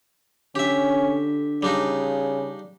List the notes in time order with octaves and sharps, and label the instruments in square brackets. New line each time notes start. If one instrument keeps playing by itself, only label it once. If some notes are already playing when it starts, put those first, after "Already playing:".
[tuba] D3 [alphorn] C#4 [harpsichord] G4 E5
[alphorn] C#3 [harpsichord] G3 D4 D#4